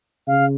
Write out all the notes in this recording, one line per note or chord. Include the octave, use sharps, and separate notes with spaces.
C#3 F5